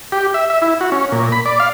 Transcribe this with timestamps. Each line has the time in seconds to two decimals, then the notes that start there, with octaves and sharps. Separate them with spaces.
0.12 G4
0.34 E5
0.50 E5
0.62 E4
0.81 F#4
0.92 C#4
1.12 A#2
1.32 B5
1.45 D5
1.60 F5